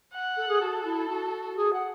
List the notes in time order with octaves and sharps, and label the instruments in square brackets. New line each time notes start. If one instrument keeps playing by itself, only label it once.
[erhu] F#5
[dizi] A4
G#4
[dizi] F#4 [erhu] A4
[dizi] E4
F#4
G#4
F#5